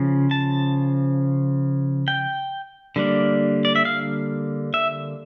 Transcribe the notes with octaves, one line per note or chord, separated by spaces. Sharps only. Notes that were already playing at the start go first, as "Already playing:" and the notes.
Already playing: C#3 F3
A5
G5
D3 G3 A#3 D4
D5
E5
F5
E5